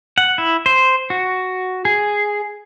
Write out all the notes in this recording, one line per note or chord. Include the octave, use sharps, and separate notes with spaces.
F#5
E4
C5
F#4
G#4